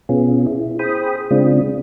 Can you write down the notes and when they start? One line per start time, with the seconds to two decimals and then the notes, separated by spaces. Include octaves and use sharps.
0.09 B2 B3 C#4 F4 G#4
0.47 E4
0.79 G#4 C5 G5 B5 D#6
1.31 C#3 G#3 C4 D4 F4